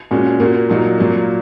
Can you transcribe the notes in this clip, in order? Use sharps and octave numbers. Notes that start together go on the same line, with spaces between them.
A#2 G#3 C#4 F#4
A#2 A#3 F#4
A#2 F#3 D#4 F#4
A#2 F#3 A#3